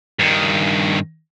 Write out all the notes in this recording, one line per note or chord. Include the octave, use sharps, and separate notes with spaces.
G2 D#3